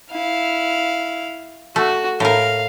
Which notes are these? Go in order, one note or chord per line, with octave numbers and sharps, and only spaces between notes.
E4 F5
A3 F#4
A2 A#4 F5